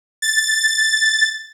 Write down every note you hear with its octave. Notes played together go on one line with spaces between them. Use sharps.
A6